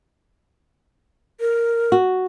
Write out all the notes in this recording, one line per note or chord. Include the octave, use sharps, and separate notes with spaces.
A#4
F#4